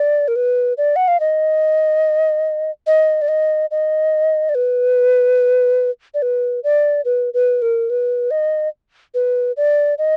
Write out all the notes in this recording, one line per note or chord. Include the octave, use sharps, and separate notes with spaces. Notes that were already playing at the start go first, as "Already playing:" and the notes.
Already playing: D5
A#4
B4
D5
F#5
F5
D#5
D#5
D5
D#5
D#5
D5
B4
D5
B4
D5
B4
B4
A#4
B4
D#5
B4
D5
D#5